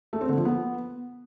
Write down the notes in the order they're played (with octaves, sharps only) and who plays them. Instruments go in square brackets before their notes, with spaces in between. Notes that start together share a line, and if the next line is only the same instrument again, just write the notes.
[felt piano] A3
C4
D3
F3
B3